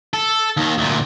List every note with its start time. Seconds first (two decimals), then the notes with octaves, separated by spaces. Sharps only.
0.14 A4
0.57 D#2 D#3
0.78 D2 A#2